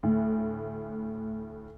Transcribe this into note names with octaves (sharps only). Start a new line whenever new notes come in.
D2 A2